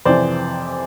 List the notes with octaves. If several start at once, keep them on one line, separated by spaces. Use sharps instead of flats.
F2 C3 E3 C5 D5